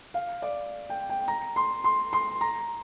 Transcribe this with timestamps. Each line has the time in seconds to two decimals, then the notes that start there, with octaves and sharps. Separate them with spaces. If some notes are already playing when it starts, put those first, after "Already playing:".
0.14 F5
0.42 D5
0.90 G5
1.09 G5
1.28 A#5
1.56 C6
1.84 C6
2.13 C6
2.41 A#5